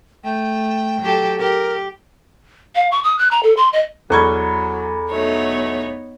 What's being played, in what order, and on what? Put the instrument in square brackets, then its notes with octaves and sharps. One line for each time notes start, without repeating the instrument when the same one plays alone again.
[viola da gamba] A3 [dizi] G5
[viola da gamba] F#3 G4 A4
[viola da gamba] G4 [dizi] A#4
[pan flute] F5
C#6
D#6
F#6
A#5
A4
C6
D#5
[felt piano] E2 C#6 G#6 [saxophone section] F#3 [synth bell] A4 A#5 B5
[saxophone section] B2 F#3 A3 [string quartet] B3 D#4 C#5